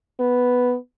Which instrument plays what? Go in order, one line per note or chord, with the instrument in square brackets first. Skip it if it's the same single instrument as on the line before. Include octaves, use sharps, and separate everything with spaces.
[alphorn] B3